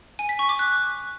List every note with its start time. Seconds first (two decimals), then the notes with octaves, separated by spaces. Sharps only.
0.19 G#5
0.29 B6
0.39 C#6
0.49 D6
0.59 F#6